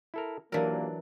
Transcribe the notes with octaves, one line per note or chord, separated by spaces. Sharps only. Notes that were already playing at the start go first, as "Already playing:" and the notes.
E4 A4 A#4
D#2 A#2 E3 F#3 A#3 D4 A#4